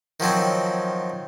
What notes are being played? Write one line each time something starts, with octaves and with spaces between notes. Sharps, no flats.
D#3 F3 F#3 C4